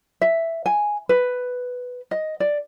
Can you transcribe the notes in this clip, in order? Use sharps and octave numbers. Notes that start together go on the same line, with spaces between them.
E5
G#5
B4
D#5
D5